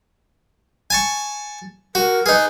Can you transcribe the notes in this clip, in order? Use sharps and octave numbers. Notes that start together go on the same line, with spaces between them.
G#5 A5 C#6
F#4 A#4
D#4 G#4 B4